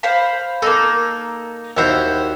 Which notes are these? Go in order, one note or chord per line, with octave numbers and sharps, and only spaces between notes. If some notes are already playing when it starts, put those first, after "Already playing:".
C5 F5 B5
A#3 D#4 A4
D#2 E4 F#4 C5 C#5